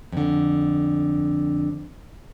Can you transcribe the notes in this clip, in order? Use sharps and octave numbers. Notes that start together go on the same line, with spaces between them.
F2 D3